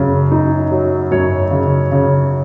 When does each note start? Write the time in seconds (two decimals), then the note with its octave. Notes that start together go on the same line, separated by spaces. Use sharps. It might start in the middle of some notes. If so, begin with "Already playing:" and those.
Already playing: F#2 C#3
0.32 D#4
0.72 F#3
1.11 F#2 C#5
1.51 C#3
1.92 C#3